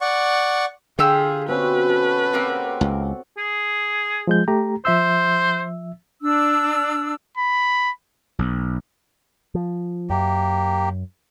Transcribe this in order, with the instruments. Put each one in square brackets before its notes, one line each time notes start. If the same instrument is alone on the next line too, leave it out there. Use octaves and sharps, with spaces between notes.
[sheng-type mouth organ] D5 F#5 C#6
[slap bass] D3 [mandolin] F4 G4 E6 [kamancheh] G#4
[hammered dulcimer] B2 C4 C#4 [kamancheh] B4
[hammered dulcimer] F#4 A4 A5
[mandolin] A#3 C4 A#4 [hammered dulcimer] G4 F#5
[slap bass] C#2
[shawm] G#4
[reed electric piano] F3 G#3 G6
A3 G4 A#5
[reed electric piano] F3 E5 E6 [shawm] C5
[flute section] D4 E6
[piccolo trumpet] B5
[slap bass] B1
[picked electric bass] F3
[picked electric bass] F#2 [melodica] A#3 G4